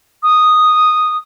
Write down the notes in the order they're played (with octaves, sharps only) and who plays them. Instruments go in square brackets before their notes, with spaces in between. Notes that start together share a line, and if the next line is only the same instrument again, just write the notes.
[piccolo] D#6